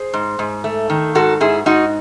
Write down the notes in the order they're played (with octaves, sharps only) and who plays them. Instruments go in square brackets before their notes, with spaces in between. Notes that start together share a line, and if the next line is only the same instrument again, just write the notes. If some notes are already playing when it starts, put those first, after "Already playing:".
Already playing: [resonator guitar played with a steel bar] G#4 C5
G#2
G#2
A3
D#3
G#2 F#4 A4
G#2 E4 G#4
G#2 D#4 F#4